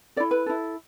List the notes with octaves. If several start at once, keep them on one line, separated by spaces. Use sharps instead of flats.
E4 A4 D5
B4
E4 A4